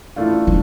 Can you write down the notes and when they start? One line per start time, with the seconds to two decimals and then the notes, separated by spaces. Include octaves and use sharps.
0.16 A1 A2 A3 D4 F4
0.47 D3